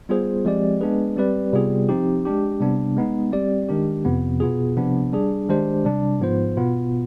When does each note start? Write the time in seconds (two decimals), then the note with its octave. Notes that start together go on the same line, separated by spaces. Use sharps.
0.09 G3 B3 F4 G#4 C5
0.45 F3 G#3 C4 G4 D5
0.81 G#3 B3 D4 G#4 B4
1.16 G3 C4 G4 B4 D5
1.53 C3 G3 B3 F4 G#4
1.89 F3 C4 D#4 G4
2.25 G#3 D4 G4
2.60 C3 G3 B3 D4
2.97 G#3 B3 D#4
3.32 G3 C4 G4 D5
3.69 D#3 G#3 D4 G4
4.05 F2 C3 F3 B3
4.40 B2 B3 F4 G#4
4.76 C3 F3 B3 D4
5.13 G3 D4 G#4
5.48 D#3 G#3 D4 G4 C5
5.85 C3 G3 D4
6.20 G#2 F3 B3 F4 C5
6.57 B2 B3 F4